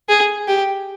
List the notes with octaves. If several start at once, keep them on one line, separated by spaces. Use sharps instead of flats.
G#4
G4